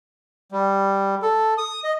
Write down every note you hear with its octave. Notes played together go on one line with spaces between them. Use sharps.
G3
A4
D#6
D#5